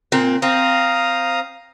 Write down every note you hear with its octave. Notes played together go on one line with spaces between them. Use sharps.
A#2 C4
C4 F5 A#5 D#6